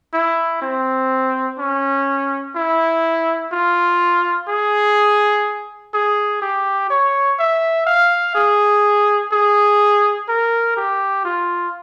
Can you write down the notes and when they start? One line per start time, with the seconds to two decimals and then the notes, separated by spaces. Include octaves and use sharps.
0.13 E4
0.62 C4
1.58 C#4
2.55 E4
3.52 F4
4.48 G#4
5.93 G#4
6.42 G4
6.90 C#5
7.39 E5
7.86 F5
8.35 G#4
9.32 G#4
10.28 A#4
10.77 G4
11.25 F4